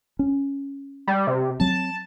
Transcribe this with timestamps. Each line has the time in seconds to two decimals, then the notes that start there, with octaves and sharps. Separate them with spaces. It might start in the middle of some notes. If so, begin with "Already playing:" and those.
0.19 C#4
1.07 G3
1.27 C3
1.60 F#3 C4 A5